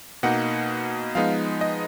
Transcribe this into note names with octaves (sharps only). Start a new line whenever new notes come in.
B2 A#3 D#4 F#5
F3 G#3 B3 D#4 F5
D#5